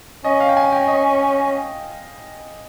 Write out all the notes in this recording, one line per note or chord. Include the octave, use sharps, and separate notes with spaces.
C#4 D#5
F5
G5
G#5
G5
D#5